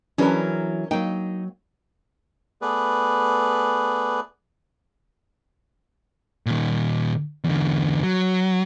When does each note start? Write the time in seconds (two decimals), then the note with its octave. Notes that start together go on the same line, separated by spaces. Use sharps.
0.18 E3 F#3 C#4 D4 G#4 A#4 B4
0.91 F#3 A#3 D#4 G5
2.62 A3 B3 G#4 B4 D5
6.46 A#2 D#3
7.44 E2 D3
8.03 F#3